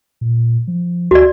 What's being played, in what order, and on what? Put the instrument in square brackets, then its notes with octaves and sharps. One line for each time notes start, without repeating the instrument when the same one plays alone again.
[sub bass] A#2
F3
[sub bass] D2 [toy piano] F#4 D5